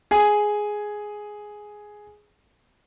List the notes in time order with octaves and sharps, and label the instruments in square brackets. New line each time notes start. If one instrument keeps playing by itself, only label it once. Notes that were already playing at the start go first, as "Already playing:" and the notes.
[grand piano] G#4 G#5